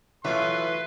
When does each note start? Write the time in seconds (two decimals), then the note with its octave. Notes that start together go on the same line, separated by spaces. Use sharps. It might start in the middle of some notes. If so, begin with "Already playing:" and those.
0.25 E3 F#3 A3 F4 B4 C6